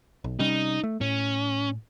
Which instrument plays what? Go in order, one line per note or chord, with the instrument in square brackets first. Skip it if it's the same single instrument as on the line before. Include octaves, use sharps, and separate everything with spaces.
[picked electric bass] B1
[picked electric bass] C3 G3 C#4 [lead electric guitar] D#4
[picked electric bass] A3
[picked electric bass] A2 [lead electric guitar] C#4